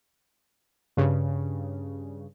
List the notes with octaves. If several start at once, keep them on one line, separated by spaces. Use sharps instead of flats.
G2 C#3